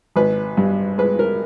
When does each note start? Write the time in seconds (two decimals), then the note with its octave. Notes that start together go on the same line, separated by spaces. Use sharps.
0.16 G#1 B4
0.57 G2
0.98 G#3 B4
1.19 A#4